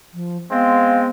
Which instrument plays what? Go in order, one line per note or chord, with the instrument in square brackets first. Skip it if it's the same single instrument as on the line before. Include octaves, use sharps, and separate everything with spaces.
[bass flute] F3
[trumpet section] G#3 C4 [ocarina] B3 [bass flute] F5